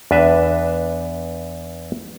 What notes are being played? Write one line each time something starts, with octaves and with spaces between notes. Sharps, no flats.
E2 D4 B4 E5